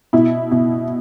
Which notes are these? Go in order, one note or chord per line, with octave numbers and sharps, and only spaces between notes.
B2 E4
B2